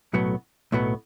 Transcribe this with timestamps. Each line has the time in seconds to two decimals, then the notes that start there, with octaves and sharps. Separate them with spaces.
0.13 B1 A2 F#3 B3
0.72 B1 A2 F#3 B3